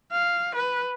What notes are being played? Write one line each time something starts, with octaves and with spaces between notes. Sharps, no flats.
F5
B4